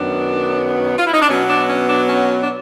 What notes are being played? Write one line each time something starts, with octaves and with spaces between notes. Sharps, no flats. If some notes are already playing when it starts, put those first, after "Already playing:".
Already playing: F#2 D#3 F#3 B3 D4
F4
E4
D#4
D4
B2 F#3 B3 C#4
D4
C#4
D4
C#4
D4